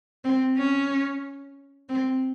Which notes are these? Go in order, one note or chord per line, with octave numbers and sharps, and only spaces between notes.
C4
C#4
C4